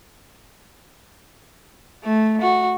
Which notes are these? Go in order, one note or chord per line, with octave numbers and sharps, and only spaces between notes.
A3
F#4